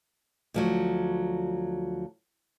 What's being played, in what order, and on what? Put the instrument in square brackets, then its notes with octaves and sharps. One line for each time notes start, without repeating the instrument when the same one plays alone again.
[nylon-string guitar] D2 F3 F#3